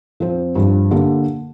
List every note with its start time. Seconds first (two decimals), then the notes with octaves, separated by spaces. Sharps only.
0.20 F2 F3 C4
0.56 G2 F3 D4
0.91 D3 A#3 G4